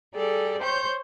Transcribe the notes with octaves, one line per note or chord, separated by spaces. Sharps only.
G3 G#4 A4 D5
C5 C#5 C6 G6